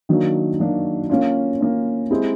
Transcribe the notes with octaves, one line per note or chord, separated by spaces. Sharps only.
D#3 F#3 A#3 D4 F#4
D#3 F#3 A#3 D4 F#4
A#3 C#4 F4
A#3 C#4 F4
G#3 C4 E4 G4